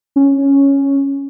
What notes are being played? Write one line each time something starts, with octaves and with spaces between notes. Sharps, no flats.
C#4